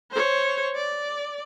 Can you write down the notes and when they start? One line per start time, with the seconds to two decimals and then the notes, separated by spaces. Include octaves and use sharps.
0.11 C5 C#5
0.76 D5